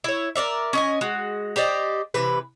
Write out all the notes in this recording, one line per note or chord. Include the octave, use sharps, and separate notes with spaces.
E4 C#5
A#4 C#5 D5 E5
C#4 D#5 G#5
G#3 F#4
G4 C5 D5 D#5
C3 E3 B4